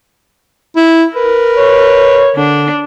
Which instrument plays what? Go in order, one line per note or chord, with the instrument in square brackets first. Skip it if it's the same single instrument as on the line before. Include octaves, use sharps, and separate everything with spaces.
[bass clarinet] E4
[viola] A#4 [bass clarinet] B4
[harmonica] C#5
[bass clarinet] D3 [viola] D4